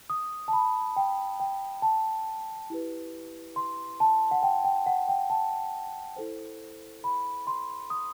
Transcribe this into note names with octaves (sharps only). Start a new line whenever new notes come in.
D#6
A5
B5
G5
G5
A5
E4 G4 B4
C6
A5
F#5
G5
G5
F#5
G5
A5
E4 A4 C5
B5
C6
D#6